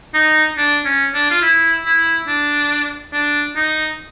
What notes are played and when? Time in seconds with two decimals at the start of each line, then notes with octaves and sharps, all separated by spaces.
0.14 D#4
0.57 D4
0.85 C#4
1.14 D4
1.31 F4
1.42 E4
1.86 E4
2.28 D4
3.13 D4
3.56 D#4